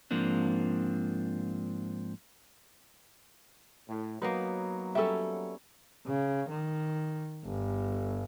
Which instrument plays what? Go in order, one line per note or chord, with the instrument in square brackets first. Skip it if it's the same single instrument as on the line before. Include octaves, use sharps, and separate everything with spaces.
[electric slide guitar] G#2 F3 A#3 C4 D4
[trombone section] A2
[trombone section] F#3 [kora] A#3 B3 D#4 [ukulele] B4
[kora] G3 C#4 [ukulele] A4 E5
[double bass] C#3
D#3
G1